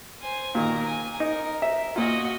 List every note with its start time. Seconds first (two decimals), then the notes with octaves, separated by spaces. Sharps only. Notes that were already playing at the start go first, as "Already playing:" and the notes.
0.22 C5 G#5
0.55 A#2 D#3 A#4 A#5
0.86 G#5
1.20 D#4 A#4
1.62 E5
1.96 A#2 F4 F#4 D#5